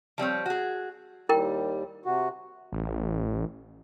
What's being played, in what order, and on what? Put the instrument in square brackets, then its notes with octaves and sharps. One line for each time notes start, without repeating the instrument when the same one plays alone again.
[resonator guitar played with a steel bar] F3 G3 C4 C#5
F#4 G#4
[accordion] D#2 G3 [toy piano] E4 A#4 G5
[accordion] C3 F#4
[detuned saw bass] A1